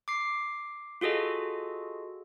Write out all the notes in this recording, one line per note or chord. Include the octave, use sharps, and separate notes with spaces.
D6 C7
F4 F#4 G#4 A4 D#5